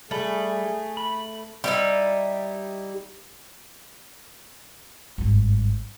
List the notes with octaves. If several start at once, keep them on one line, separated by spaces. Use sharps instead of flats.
G3 A3 G#4 B5
B5
G3 D#4 E4
G#1 G2